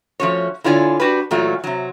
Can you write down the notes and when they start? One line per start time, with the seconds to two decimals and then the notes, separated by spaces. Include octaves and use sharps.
0.20 F3 A3 C#4 F#4 C#5
0.64 D3 E4 F4 C#5 D5 G#5
1.00 D4 F#4 G4 B4
1.31 A#2 E3 F#3 A3 F4
1.64 C3 F#3